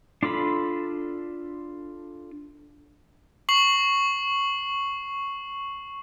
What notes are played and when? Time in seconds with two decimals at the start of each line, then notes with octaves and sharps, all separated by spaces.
0.23 D4 F4 A4 B5
3.49 C#6 C7 F#7